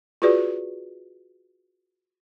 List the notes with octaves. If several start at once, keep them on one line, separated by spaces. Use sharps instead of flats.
F4 F#4 G#4 B4 D5